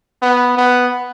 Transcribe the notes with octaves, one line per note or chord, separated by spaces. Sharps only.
B3
B3